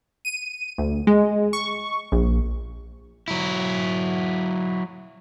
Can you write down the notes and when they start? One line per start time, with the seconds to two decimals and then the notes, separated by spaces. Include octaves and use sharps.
0.25 D#7
0.78 D2
1.07 G#3
1.53 C#6
2.12 A#1
3.28 F#3 E4